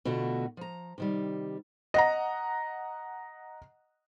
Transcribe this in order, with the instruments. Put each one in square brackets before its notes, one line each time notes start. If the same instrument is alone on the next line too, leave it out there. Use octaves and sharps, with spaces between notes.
[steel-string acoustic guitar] B2 D3 A3 F4 F#4
F3 A#5
C3 D#3 G3
[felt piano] D#5 F#5 A#5